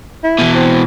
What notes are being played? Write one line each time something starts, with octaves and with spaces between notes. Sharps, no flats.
E4
B2 E3
C4